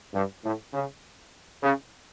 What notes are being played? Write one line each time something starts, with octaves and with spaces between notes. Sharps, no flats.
G2
A2
C#3
C#3